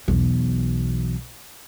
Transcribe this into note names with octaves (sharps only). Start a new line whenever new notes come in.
B1 E2